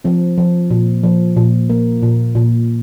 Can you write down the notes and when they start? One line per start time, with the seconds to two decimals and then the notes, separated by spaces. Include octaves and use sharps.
0.04 F3 C4
0.38 F3
0.70 A#2
1.03 F3
1.37 A#2
1.70 A#3
2.03 A#2
2.35 A#2